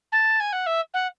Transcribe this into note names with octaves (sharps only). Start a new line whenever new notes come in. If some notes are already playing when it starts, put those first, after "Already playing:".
A5
G#5
F#5
E5
F#5